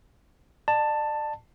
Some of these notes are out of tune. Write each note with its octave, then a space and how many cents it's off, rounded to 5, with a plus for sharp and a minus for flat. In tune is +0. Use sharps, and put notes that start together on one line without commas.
D5 +40 A5 +10